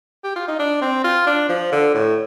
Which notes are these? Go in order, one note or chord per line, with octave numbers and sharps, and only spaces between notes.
G4
F4
D#4
D4
C4
F4
D4
F3
D3
A2